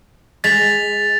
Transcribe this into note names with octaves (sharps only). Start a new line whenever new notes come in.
G#3 A6 B6 F7